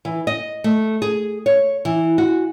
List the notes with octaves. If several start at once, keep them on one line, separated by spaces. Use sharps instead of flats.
E3
D#5
A3
G#4
C#5
E3
F#4